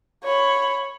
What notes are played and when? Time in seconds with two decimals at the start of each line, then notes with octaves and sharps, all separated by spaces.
0.24 C#5 B5